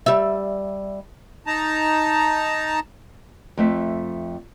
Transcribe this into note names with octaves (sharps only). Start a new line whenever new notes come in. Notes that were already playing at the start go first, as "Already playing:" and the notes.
G3 E5
D#4 A5 A#5
F2 A3 E5